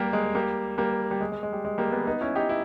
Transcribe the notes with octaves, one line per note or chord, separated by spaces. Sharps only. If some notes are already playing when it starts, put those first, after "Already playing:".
Already playing: G3 A#3 G4 A#4
G#3
G3 A#3
G3 A#3
G3
G#3
G#3
G#3
G3
G#3
G3 A#3
G#3 B3
B3 D#4
C#4 E4
D#4 G4
E4